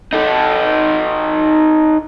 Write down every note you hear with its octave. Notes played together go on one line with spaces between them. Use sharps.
D#4 A4